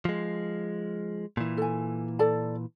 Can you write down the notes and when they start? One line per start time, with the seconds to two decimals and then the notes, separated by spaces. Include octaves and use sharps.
0.05 F3 G#3
1.37 A#2 E3
1.57 A4 G#5
2.19 A4 D5 A5